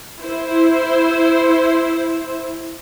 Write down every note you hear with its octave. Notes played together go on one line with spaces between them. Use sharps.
E4 C5